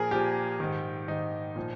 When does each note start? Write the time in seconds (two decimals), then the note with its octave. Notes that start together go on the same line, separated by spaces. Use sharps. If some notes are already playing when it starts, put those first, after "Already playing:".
Already playing: A#2 F3 G#4 A#4
0.11 A#2 F3 G4
0.60 G#2 D#3
1.08 G#2 D#3 D#4
1.56 A#2 F3